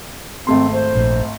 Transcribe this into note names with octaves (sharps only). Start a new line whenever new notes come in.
G#1 A3 C4 C6
C5
A#1